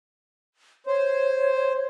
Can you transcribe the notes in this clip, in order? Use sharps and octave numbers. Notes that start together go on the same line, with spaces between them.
C5 C#5